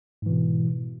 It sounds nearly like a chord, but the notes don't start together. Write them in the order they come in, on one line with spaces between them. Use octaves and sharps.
G#2 E3 B2